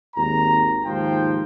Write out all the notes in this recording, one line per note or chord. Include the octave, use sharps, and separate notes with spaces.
G#1 D#2 A#5
D#2 G#2 F3 C5 G5